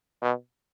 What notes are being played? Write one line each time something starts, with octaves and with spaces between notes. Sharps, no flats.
B2